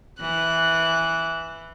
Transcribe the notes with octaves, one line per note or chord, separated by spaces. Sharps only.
E3 F#6